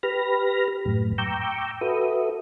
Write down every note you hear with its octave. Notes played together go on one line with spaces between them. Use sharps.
G4 B4 B5 F6 A#6
F#2 A2
G5 A#5 C#6 D6 E6 G6
F#4 A4 B4 E5 D#6